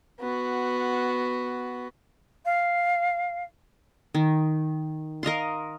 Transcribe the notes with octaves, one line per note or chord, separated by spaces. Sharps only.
B3 F#4
F5
D#3
A#4 D#5 F5 C6